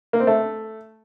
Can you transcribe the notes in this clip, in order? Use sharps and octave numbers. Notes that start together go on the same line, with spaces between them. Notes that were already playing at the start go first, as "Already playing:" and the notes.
A#3
C4
A3